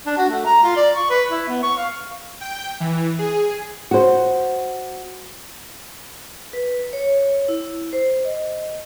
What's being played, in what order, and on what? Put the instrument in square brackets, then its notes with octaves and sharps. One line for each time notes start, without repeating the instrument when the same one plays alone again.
[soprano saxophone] D4
F#4
A3
A#5
F4
D5
C#6
B4
E4
B3
C#6
F5
[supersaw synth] G5
E3
G#4
[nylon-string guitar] F#4 C5
[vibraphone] B4
C#5
E4
C5
D#5